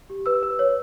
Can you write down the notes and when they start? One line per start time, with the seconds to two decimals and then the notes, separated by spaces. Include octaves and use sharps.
0.10 G4
0.26 B4 E6
0.43 B4
0.59 C#5